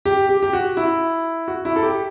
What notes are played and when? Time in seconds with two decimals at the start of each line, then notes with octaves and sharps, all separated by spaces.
0.05 G4
0.29 G4
0.43 G4
0.53 F#4
0.77 E4
1.48 F#4
1.65 E4
1.76 A4
1.83 G4